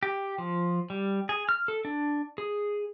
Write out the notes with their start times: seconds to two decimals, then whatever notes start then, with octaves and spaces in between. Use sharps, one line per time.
0.03 G4
0.38 F3
0.90 G3
1.29 G#4
1.49 F6
1.68 A4
1.85 D4
2.38 G#4